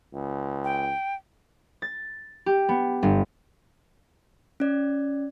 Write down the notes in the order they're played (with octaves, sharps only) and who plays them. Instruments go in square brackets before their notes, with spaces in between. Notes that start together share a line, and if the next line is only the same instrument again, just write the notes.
[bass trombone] C#2
[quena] G5
[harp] A6
G4
B3
G1
[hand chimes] C#4 D5